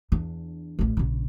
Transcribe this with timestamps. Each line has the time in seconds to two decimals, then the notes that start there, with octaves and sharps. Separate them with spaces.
0.12 E2 D4
0.79 A1 D2
0.97 A#1 C#3